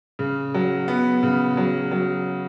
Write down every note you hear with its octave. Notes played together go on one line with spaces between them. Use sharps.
C#3
F#3
B3
C#3
F#3
F#3